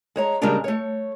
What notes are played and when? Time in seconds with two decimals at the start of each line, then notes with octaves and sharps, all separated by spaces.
0.16 G#3 C#5 A#5
0.41 C#3 G3 G#3 A#3 D4 A#5
0.64 A3 C#5